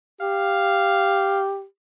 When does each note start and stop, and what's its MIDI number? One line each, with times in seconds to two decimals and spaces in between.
0.21 1.64 67
0.21 1.42 77